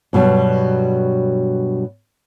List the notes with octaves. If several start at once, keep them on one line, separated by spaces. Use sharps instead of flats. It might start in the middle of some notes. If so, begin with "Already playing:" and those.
G2 B2 F#3 G3